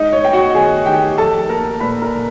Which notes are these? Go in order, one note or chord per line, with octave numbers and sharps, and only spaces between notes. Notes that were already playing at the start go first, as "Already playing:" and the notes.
Already playing: G#3 D#4 D#5
C#5
B3 G5
F#4 F#5
D#3 G#4 G#5
D#3 G4 G5
F3 A4 A5
A#3 A#4 A#5
A#2 B4 B5
A#4 A#5
A#2